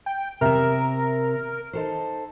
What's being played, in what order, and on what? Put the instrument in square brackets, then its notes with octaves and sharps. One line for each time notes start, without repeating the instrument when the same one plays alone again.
[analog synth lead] G5
[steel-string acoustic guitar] C3 E5 [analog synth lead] A#4
[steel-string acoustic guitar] D#4 A4 C5